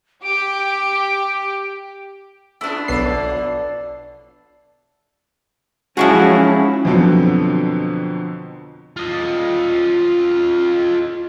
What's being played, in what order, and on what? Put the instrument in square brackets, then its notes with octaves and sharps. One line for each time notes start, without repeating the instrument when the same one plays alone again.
[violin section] G4 [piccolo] D7
[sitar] G#3 B3 F4 [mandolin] D4 E4
[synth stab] B1 B3 C7 [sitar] F3 A4 D5
[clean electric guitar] G#2 E4 [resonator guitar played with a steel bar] F3 F#3 G#4 [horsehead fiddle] C#4 [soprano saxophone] F#4
[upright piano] F2 B2 D3 F#3 C4
[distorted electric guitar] F4 D#5